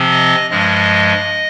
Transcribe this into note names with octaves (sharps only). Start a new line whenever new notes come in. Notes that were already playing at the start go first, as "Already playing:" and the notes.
Already playing: C3 F3 C4
D#5
G2 F3 G#3 D#5